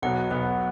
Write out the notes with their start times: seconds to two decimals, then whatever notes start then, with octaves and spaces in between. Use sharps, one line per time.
0.02 B1 B2 F#3 B3 F#5
0.31 B1 B2 F#3 B3